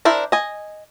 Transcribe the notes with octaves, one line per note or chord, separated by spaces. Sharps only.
D4 E4 A#4 C5
D#5 G#5